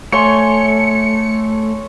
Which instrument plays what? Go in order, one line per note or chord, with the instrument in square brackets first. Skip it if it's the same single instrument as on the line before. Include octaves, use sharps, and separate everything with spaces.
[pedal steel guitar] A3 [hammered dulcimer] C#5 G#5 C6 [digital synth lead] C#7